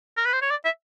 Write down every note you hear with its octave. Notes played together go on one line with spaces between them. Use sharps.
A#4
B4
C5
C#5
D5
E5